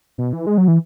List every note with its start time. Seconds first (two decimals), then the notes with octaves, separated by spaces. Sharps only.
0.18 B2
0.33 E3
0.47 G#3
0.58 F#3
0.68 E3